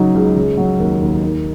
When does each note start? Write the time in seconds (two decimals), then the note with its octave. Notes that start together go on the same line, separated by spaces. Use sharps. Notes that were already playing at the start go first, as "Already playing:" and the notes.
Already playing: C#3 F#3 D#4
0.14 C#2
0.36 C#3
0.57 F#3
0.80 D#2
1.01 D#2
1.23 D#3